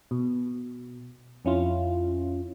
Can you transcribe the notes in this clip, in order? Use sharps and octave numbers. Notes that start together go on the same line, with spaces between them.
B2
F2 C#4 E4 F4